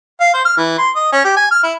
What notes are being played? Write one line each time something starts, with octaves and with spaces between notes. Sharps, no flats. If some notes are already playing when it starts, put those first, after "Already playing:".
F5
C5
F6
E3
C6
D#5
C#4
G4
G#5
F6
E4